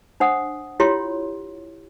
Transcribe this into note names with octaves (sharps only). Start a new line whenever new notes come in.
D4 C5 F#5 D#6
E4 F4 G4 C#5 C6